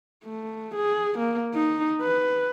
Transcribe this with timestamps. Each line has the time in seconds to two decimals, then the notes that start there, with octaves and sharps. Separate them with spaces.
0.24 A3
0.75 G#4
1.19 A#3
1.54 D#4
2.02 B4